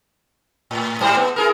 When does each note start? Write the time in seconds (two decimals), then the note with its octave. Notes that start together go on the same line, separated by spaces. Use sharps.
0.71 A2
1.01 G#2 G3 C5
1.16 B3
1.36 E4 G#4 A#4